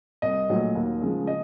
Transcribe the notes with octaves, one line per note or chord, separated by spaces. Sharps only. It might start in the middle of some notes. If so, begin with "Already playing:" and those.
C2 D#5
A#2 F#3 A3
D#2
C#3 F3 G#3
D#5